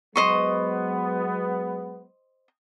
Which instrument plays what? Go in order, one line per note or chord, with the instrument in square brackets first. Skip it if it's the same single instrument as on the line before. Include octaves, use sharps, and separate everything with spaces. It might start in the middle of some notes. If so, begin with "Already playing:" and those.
[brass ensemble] F#3 G#3 B3 [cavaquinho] C5 D#5 C#6